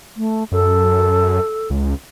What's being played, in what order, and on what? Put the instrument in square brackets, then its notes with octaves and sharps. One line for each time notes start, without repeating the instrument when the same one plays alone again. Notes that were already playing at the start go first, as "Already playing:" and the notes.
[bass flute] A3
[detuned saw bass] F#2 [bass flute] A4
[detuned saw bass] C#2